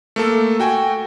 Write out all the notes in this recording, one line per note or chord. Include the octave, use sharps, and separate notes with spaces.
A3 A#3 A4
F#4 G5 G#5